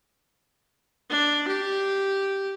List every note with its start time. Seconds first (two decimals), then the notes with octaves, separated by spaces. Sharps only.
1.10 D4
1.48 G4